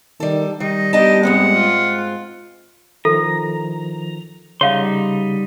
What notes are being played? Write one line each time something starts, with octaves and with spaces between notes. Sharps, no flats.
D#3 G3 A4
D#3 G3 D#4
B3 D4 D#4 G4 D#5 A5
G#2 C3 G#3 B3 C4 F#5
F4
D#3 F3 A4 A#5
C#3 G3 D#4 C#5 F5 F#5 C6